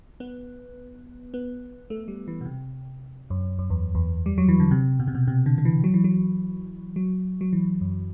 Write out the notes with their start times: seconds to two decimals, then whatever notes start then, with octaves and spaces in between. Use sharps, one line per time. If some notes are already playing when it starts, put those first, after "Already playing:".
0.20 B3
1.34 B3
1.90 A3
2.08 G3
2.28 E3
2.41 B2
2.46 C3
3.30 F#2
3.59 F#2
3.70 E2
3.95 E2
4.26 G3
4.38 F#3
4.48 E3
4.60 D3
4.71 C3
5.00 B2
5.07 C3
5.15 B2
5.28 C3
5.46 D3
5.58 D3
5.65 E3
5.84 F#3
5.94 E3
6.04 F#3
6.96 F#3
7.41 F#3
7.53 E3
7.81 F#2